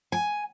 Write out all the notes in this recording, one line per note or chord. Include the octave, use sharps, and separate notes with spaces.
G#5